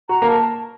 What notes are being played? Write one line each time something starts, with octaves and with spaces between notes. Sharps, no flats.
F#4 A#5
A#3 A#4
A5